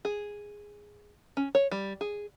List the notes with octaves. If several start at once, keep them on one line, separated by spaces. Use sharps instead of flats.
G#4
C#4
C#5
G3
G#4